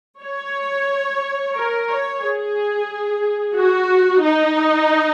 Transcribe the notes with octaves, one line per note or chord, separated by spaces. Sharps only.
C#5
A#4
C#5
G#4
F#4
D#4